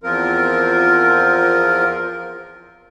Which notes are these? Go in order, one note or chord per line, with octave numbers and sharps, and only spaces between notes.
E2 F3 C4 F4 A#4